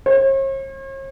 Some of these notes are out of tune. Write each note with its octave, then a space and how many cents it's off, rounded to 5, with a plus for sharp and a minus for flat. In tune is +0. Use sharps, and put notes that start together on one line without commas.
C#5 -45